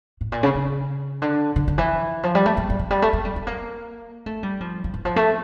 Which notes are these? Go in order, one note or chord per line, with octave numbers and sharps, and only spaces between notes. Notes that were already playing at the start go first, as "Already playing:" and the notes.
A2
A#2
C#3
C#3
D3
D3
D3
E3
F3
G3
A3
A3
G3
F3
G3
A3
A3
G3
A3
A#3
A3
G3
F3
F3
E3
F3
A3